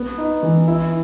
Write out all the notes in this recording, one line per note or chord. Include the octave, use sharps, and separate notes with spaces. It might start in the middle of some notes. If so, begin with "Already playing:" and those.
Already playing: B3
D#4
E3
E4